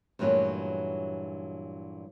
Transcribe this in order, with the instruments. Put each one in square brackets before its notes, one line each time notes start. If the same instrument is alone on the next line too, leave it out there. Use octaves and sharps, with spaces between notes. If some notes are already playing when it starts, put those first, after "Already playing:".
[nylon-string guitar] G2 A#2 E3 F#3 A3 C#4